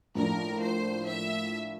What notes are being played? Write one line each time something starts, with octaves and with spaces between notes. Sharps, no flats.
A2 F3 A#3 D4 A#4
C5
E5